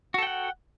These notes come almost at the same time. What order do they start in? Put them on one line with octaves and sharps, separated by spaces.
F#4 A4 G5 F#5